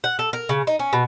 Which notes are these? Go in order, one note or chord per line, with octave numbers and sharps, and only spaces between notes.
F#5
A4
A#4
C#3
D#4
C#4
B2